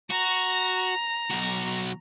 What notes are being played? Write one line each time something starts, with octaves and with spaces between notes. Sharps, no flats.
F#4 A#5
B1 F#4